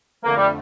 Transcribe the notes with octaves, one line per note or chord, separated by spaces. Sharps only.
F2 D3 A3 A#3
G3